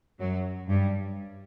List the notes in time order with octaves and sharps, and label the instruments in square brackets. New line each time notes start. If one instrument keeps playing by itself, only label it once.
[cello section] F#2 F#3
G2 G3